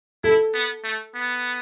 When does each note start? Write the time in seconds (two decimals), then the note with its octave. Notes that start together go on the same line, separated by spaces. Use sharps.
0.24 E4 A4
0.55 B3
0.84 A3
1.15 B3